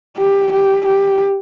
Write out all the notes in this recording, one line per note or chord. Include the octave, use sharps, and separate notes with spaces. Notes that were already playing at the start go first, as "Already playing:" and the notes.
G4
G4
G4